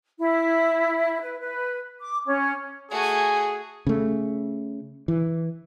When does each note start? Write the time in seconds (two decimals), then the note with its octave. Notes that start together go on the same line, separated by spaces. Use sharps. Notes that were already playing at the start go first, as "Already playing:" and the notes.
0.19 E4
1.21 B4
1.40 B4
2.00 D6
2.26 C#4
2.91 A3 F#4 G#4 G#5
3.87 C#3 A3
5.08 E3